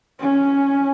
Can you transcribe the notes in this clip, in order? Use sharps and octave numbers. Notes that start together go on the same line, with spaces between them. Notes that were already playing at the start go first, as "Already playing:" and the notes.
C#4